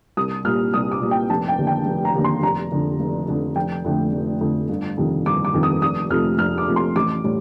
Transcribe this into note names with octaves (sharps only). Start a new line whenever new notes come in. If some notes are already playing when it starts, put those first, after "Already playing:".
C2 D#6
A#2 G3 F6
C2 D#6
D6
A#2 G3
G5
F1 A5
G5
D#2 D3
G5
F1
A#5
D#2 D3
C6
F1 A#5
F2 D3
F1
F2 D3
F1 G5
F2 D3 A3
F1
F2 D3 A3
G1
F2 C3 D#3
G1 D6
D6
F2 C3 D#3
D#6
F1 D#6
F2 C3 F3 A3 F6
F1 F6
D6
F2 C3 F3 A3
C6
A1 D6
A2 G3